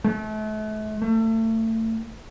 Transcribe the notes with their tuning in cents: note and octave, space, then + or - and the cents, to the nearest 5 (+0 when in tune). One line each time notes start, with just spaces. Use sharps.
A3 -40
A3 +30